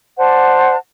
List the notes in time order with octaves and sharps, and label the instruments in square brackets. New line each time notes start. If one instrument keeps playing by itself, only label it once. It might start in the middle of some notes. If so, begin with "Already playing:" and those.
[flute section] C5 D5 F#5 A5